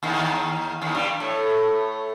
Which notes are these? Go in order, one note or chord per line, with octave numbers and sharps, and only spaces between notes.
D#2 D#3
D#2 D#3
G2 G3
A2 A3